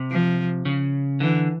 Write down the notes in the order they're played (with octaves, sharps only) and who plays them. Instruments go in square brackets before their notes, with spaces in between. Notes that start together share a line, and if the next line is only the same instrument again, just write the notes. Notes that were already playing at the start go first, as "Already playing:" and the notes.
Already playing: [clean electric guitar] C3
[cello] F3
[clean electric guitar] C#3
[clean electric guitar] D3 [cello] E3